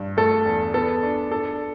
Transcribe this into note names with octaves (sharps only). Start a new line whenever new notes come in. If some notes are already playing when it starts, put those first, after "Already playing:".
Already playing: G2 D4
A3 A4
E2
B3 A4
D4
D4 A4